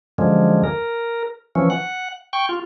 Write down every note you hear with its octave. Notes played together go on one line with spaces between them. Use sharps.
F#2 D3 F3 G#3
A#4
E3 F3 C#4
F#5
G5 C#6
F4